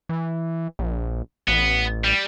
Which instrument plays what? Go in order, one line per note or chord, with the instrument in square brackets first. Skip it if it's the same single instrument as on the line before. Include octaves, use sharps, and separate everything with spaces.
[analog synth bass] E3
A#1
[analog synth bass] A1 [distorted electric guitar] B3
[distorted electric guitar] G3